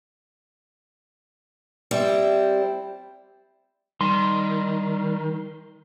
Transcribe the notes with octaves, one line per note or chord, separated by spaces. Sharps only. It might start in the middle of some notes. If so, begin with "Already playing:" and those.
G3 C4 E4
D#3 G3 C6